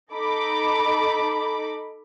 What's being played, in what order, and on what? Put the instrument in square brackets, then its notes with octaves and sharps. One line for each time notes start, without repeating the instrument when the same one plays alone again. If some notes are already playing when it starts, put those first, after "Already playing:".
[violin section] D#4 A4 B5 D6